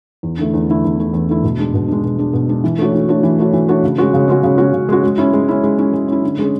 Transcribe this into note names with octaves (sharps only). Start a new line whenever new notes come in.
E2
D3 A3 E4
E2
D3 A3 E4
E2
D3 A3 E4
E2
D3 A3 E4
B2
G#3 D4
B2
G#3 D4
B2
G#3 D4
B2
G#3 D4
E3
A3 D4 F#4 C#5
E3
A3 D4 F#4 C#5
E3
A3 D4 F#4 C#5
E3
A3 D4 F#4 C#5
C#3
G#3 C#4 F#4
C#3
G#3 C#4 F#4
C#3
G#3 C#4 F#4
C#3
G#3 C#4 F#4
G#3
C#4 E4
G#3
C#4 E4
G#3
C#4 E4
G#3
C#4 E4
D3
G#3 C#4 G#4